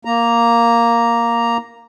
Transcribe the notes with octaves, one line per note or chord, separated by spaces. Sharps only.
A#3 A#5